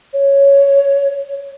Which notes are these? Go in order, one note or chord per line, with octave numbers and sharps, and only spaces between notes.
C#5